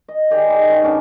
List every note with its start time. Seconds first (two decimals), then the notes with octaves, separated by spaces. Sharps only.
0.08 D#5
0.31 D#3 G4 G#4 D5
0.50 D#4
0.68 D#3 C#4
0.83 B3 C#4 D4